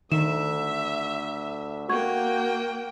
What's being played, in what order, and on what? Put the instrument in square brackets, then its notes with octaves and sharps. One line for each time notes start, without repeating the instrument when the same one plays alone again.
[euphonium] D2 [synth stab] D#3 [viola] E5 [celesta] E7
[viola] A#3 G5 [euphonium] F#4 [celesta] C#6 G#6